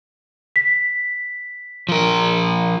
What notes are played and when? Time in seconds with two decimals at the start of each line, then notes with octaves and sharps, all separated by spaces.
0.56 B6
1.89 F3 A#4